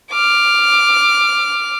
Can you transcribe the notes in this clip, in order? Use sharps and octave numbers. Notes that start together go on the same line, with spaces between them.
D6 F6